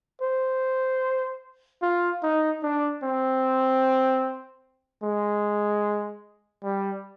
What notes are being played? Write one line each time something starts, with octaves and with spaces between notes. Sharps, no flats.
C5
F4
D#4
D4
C4
G#3
G3